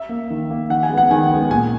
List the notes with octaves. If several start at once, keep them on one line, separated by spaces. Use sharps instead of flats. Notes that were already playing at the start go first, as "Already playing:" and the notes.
Already playing: E5
A#3
D#3
A#3
D#3 F#5
G#5
G#3 B3
F#5
D#3 G#5
G#3 B3
A#2 G#5